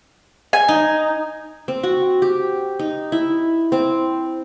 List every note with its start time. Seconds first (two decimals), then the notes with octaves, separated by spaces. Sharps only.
0.53 G#5
0.68 D#4
1.68 C4
1.83 F#4
2.22 G4
2.79 D#4
3.12 E4
3.72 C4